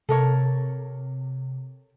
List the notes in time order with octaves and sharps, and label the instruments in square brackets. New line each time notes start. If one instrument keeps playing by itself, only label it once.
[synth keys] C3 [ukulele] A4 A#4 C#5